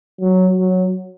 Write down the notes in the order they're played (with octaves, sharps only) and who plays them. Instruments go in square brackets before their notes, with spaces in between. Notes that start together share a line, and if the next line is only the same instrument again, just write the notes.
[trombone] F#3
F#3